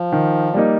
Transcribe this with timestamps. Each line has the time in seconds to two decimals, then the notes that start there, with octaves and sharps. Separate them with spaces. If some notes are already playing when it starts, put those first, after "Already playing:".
Already playing: F3
0.12 D#3
0.54 G3 A#3 D#4